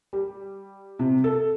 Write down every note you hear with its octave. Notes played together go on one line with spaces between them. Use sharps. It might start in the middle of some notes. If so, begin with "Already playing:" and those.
G3
C3
A4